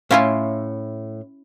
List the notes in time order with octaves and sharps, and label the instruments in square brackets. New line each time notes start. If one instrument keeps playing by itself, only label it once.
[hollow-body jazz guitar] A2 F5 C6 [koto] C#4 E4 F4